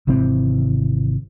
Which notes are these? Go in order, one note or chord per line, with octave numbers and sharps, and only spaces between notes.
G#1 C3 E3 C4